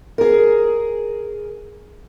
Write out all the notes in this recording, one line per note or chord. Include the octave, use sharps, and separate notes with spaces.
G#4 A#4